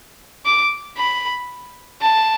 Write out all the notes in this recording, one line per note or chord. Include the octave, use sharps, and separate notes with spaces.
D6
B5
A5